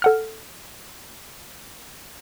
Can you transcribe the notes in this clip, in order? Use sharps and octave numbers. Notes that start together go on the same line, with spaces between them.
A4 F#5 F6